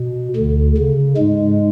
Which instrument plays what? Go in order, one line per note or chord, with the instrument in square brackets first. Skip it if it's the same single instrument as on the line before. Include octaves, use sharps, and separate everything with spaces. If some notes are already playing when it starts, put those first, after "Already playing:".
Already playing: [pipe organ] B2
D2 D3
C#3
G#2 G#3